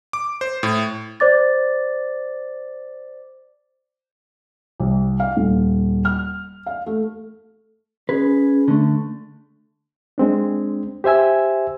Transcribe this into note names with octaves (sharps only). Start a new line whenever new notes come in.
D6
C5
A2
C5 D5 D6 A6
C2
F5
D#1
F6
F5
A3
C#4 G#4 B4
D3 A3
G#3 C4 D4
G4 C5 E5 G#5 E6